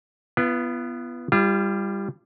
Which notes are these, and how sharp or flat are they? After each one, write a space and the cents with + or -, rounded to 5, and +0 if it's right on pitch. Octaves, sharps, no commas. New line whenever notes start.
B3 +0 F4 -45 B4 +0
G3 +15 F4 -35